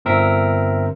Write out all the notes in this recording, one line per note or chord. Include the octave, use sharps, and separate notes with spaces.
G1 C4 A#4 E5